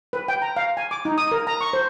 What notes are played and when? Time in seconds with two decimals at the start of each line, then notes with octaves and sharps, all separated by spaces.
0.13 B4
0.28 G5
0.42 A#5
0.57 F5
0.77 G#5
0.91 D6
1.05 D#4
1.18 D#6
1.32 A#4
1.47 A#5
1.61 C#6
1.73 C5